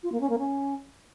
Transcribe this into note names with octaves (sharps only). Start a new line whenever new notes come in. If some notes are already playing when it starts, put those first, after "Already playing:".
F4
A#3
C#4
A#3
C#4